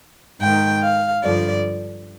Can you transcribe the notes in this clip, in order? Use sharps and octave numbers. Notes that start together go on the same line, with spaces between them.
G#2 D#3 G5
F5
G2 D3 F3 D5